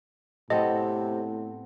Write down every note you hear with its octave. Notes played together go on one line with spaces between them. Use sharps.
A2 C3 B3 C4 A4 D#5